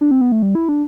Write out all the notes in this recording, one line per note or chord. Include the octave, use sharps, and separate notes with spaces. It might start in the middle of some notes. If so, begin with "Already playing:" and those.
D4
C4
B3
A3
G3
E4
D4